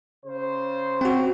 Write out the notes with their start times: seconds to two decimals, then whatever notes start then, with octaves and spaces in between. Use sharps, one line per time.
0.25 C#3 C5
1.01 C4 F#4